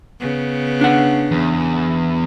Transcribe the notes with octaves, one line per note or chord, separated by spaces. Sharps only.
C#3 B3
D4 F#5
E2